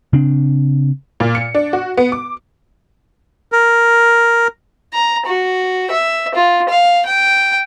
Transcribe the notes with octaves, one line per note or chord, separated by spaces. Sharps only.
C#3 C4 D4
A#2
C#7
D4
F#4
B3
D6
A#4
A#5
F#4
E5
F4
F5
G5